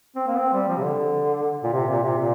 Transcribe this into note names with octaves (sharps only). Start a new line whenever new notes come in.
C4
A#3
C4
G3
F3
C3
D3
A#2
C3
A#2
C3
A#2